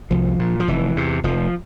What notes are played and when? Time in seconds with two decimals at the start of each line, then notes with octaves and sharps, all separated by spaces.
0.11 C2 F3
0.39 A#2
0.60 F3
0.68 F1 E3
0.96 E2 C3
1.24 F1 F3